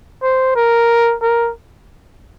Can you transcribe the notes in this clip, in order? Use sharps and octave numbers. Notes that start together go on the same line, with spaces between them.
C5
A#4
A#4